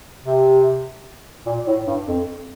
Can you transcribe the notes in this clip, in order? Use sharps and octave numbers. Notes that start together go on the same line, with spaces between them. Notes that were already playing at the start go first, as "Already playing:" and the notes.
C3
A#2
A2
G2
F2